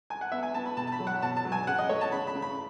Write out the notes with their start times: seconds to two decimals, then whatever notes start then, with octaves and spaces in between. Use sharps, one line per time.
0.10 G#5
0.21 F#5
0.32 B3 E5
0.43 G#5
0.54 B3 A5
0.66 B5
0.77 B2 A5
0.87 A5
0.92 B5
1.00 F#3
1.07 F#5
1.22 B2 A5
1.37 A5
1.45 F#3
1.52 G#5
1.67 C#3 F#5
1.79 D#5
1.89 A3 C#5
2.01 A5
2.12 C#3 B5
2.27 B5
2.35 C#3
2.42 B5